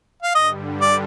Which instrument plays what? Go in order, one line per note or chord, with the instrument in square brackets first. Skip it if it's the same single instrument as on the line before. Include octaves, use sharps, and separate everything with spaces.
[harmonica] F5
[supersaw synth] G2 D3 G3 [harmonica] D#5
[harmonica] D5